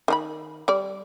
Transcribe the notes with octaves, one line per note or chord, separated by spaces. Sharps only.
D#3 D#4 B5
G3 D5